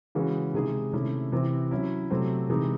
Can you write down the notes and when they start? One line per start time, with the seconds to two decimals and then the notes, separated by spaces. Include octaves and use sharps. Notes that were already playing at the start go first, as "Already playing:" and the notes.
0.15 C#3 E3 G#3 C#4 F#4
0.54 C3 D#3 G#3 D#4 G#4
0.93 C3 D#3 A3 C#4 E4
1.32 C3 E3 C4 E4
1.71 F#3 C#4 E4
2.10 C3 F#3 A3 C4
2.49 C3 E3 G#3 D#4